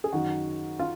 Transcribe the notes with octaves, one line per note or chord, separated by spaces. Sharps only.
G#4
F#2 D#3 F#4
F4